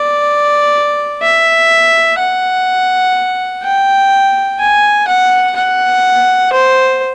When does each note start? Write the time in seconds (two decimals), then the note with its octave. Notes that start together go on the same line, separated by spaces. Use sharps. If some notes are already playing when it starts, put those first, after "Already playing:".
Already playing: D5
1.22 E5
2.19 F#5
3.64 G5
4.59 G#5
5.07 F#5
5.56 F#5
6.53 C5